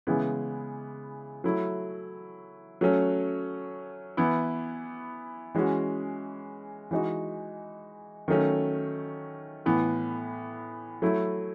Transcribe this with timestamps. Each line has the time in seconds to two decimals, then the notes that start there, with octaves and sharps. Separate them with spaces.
0.07 C#3 E3 G#3 B3 E4
1.44 F#3 A3 E4
2.81 F#3 A3 C#4
4.17 E3 B3 E4
5.55 E3 G#3 C#4 F#4
6.91 E3 G#3 D#4 F#4
8.28 D#3 F#3 A3 C#4
9.66 A2 E3 B3
11.02 F#3 A3 E4